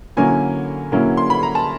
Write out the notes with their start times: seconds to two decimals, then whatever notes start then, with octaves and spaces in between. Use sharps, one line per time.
0.17 D3 F#3 A#3 C#4 E4 G#5
0.92 D3 F#3 A#3 C#4 E4
1.17 C6
1.30 B5
1.43 A#5
1.55 A5